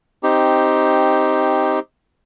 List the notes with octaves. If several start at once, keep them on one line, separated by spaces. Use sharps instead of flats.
C4 D#4 G4